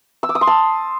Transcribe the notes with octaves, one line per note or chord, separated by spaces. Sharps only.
E6
D6
D#6
C6
A5